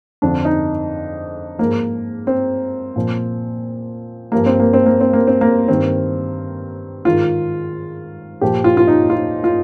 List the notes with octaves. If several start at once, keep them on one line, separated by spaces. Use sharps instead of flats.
F2 D3 F3 D4
D#4
G#2 F3 A#3
C4
A#2 F3
G2 F3 A#3
C4
A#3
C4
A#3
C4
A#3
C4
A#3
G2 D#3 C4
G#2 D#3 F4
A#2 F3 G4
F4
F4
D#4
F4
F4